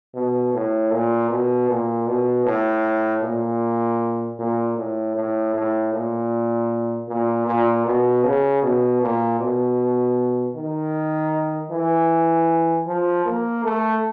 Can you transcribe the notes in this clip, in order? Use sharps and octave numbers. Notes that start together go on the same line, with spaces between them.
B2
A2
A#2
B2
A#2
B2
A2
A#2
A#2
A2
A2
A2
A#2
A#2
A#2
B2
C#3
B2
A#2
B2
D#3
E3
F3
A#3
A3